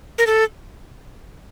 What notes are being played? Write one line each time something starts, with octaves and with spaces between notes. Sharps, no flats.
A#4
A4